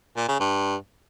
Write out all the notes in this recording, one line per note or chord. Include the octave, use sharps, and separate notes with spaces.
A#2
C#3
G2